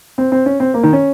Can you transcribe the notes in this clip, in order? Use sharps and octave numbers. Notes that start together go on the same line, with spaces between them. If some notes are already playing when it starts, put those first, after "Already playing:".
C4
C4
C#4
C4
A#3
D#3
C#4